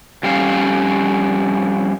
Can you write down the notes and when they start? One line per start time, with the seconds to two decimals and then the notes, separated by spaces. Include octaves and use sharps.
0.23 F2 G3 C#4 F5